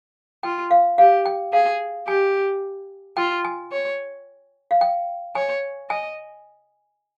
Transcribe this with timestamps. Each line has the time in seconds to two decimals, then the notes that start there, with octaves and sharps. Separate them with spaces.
0.43 F4 G5
0.71 F5
0.98 G4 F5
1.26 G5
1.53 G#4 F5
2.07 G4 G#5
3.17 F4 G5
3.45 G#5
3.72 C#5
4.71 F5
4.81 G5
5.35 C#5 G#5
5.90 D#5 G#5